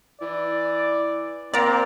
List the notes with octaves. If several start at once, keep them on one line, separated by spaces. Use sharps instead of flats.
E3 D5
A#3 C4 D5 A#5